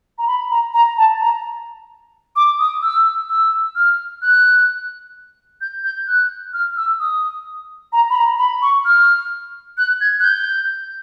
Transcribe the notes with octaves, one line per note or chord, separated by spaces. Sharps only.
A#5
B5
A#5
A#5
A5
A#5
D6
D#6
E6
E6
F6
F#6
G6
G6
F#6
F6
E6
D#6
A#5
B5
A#5
B5
C#6
F6
F#6
G#6
F#6
G6